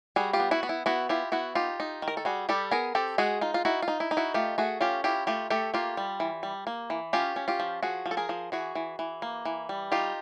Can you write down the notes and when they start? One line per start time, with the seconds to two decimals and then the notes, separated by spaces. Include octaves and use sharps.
0.16 G3 F#4 G#4
0.33 F4 G4
0.40 B3
0.51 E4 F#4
0.63 B3
0.69 E4
0.86 B3 E4 F#4
1.09 E4 F4 G4
1.32 B3 E4 F#4
1.55 D#4 F4 G4
1.80 D#4
2.02 D#3
2.08 A#4
2.17 A4
2.25 G3 F#4 G#4
2.49 G3 G4 A4
2.71 B3 G#4 A#4
2.95 C4 G4 A4
3.18 G#3 F#4 G#4
3.41 D#4 F4
3.54 F4
3.65 D#4 E4 F#4
3.82 F4
3.88 D#4
4.00 E4
4.11 D#4
4.17 E4 F#4
4.34 A3 F4 G4
4.58 A3 F#4 G#4
4.81 C#4 F4 G4
5.04 E4 F4 G4
5.27 A3 F4 G4
5.50 A3 G4 A4
5.74 A#3 F4 G4
5.97 G3
6.20 E3
6.43 G3
6.67 A#3
6.90 E3
7.13 C#4 F4 G4
7.36 C#4
7.48 F4 G4
7.60 F3
7.83 F3 F#4 G#4
8.06 F3
8.11 A4
8.17 G#4 A#4
8.29 F3
8.52 E3 F#4 G#4
8.75 E3
8.99 E3
9.22 A#3
9.45 E3
9.69 G3
9.92 D#4 F4 G4